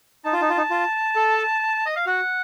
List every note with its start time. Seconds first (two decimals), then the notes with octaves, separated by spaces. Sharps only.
0.25 D#4 A5
0.33 F4
0.41 D#4
0.50 F4
0.57 D#4
0.71 F4
1.16 A4
1.86 D#5
1.96 F5
2.06 F#4 F#5